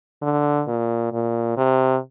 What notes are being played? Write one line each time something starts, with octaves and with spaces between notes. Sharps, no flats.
D3
A#2
A#2
C3